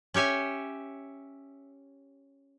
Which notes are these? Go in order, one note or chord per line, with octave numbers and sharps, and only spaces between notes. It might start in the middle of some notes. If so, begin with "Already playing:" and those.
C#4 G4 C#5 E5 G#5